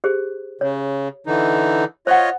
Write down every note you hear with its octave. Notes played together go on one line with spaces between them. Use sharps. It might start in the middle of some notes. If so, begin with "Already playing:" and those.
G4 G#4 C5
C#3 C#5
D3 E3 D#4
F4 C5 C#5 D#5 F#5